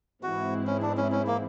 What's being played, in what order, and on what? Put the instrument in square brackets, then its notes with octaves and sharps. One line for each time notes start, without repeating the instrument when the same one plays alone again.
[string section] G#2 E3 G#3 C4 E4 [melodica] F#4
[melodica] C#4
D4
C#4
C#4
A#3